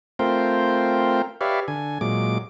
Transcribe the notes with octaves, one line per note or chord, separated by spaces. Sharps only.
A3 C4 F4 A#4 C5 G5
G4 B4 C#5 D5 E5 F5
D3 G#5
A#2 F#3 G#3 D6